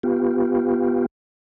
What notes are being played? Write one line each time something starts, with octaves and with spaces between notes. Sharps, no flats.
B3 F4 G4